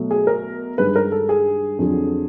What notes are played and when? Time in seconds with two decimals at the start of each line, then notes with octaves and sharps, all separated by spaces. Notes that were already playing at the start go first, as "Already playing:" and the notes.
Already playing: B2 F#3 A3
0.11 G#4
0.27 A#4
0.78 G2 D#3 G#3 B4
0.96 A#4
1.12 A4
1.29 G#4
1.79 F2 D3 F#3